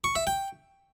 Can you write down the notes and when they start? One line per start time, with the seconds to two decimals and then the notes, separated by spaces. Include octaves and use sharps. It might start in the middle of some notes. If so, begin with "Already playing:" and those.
0.04 C#6
0.15 E5
0.27 G5